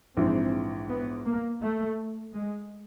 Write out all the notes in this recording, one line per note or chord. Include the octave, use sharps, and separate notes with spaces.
A#1 G#2 E3 C4
B3
A#3
A3
G#3